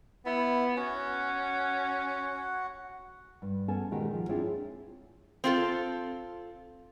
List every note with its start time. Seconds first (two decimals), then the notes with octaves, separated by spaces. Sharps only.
0.26 B3 E4
0.77 C#4 F#4 F#5
3.42 G2
3.68 B3 C#4 A4 G#5 A5
3.91 A#2 D#3 G#3 F#4 G4
4.13 F3
4.29 C4 D4 E4 F4 G#4 C#5
5.44 C4 F4 A4